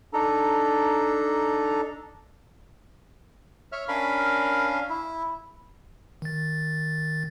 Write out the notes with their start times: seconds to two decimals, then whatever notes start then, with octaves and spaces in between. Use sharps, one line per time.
0.13 D4 D#4 A4 A#5
3.72 C#5 E5 F6
3.88 C#4 D4 A#4 F5 B5
4.90 E4
6.22 D#3 A6